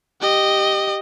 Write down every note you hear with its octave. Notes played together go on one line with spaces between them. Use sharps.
G4 D#5